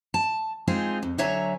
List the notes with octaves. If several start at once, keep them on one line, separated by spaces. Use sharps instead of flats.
A5
G#3 C4 D#4 F4 G#4
F2
D3 F#3 C#5 E5 G#5 A#5